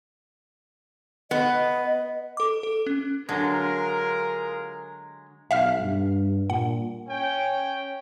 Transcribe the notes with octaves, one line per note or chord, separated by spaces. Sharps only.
B3 D#5
A4 D6
A4
C#4
D3 F#3 G#3 F4 G#4 A#4
B1 E5 F5 F6
G2
A#2 F#5
C#4 G5